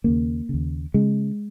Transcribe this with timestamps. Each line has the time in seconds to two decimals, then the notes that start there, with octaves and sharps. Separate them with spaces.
0.04 D#2 C#3 A#3
0.49 D#2 C#3
0.94 C#3 G#3